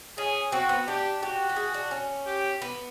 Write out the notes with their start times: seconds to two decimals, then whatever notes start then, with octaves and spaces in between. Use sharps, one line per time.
0.18 C#4 G#4
0.52 C4 F#4
0.69 B3
0.87 D4 G4
1.22 F#4 G4
1.49 G4
1.56 G#4
1.74 D4
1.91 C#4
2.27 G4
2.62 B3